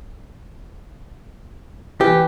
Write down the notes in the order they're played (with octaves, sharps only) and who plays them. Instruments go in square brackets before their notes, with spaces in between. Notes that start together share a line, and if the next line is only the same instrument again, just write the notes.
[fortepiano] E3 [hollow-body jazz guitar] G4